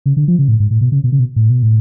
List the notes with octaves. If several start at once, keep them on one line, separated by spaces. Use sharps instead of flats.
C#3
D3
F3
C#3
A2
G#2
A2
B2
C#3
B2
C#3
B2
A2
B2
A2